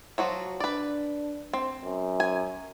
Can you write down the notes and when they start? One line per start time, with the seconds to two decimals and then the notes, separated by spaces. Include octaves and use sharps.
0.18 F3 F#3 F#4
0.60 D4 B4 D5
1.53 C4
1.84 F#2
2.20 G#5